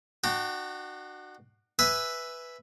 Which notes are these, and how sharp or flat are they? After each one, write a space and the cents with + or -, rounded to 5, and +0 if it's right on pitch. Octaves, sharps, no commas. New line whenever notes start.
D4 +40 F#4 +0 G5 -10
B4 +0 E5 +0 G#5 +0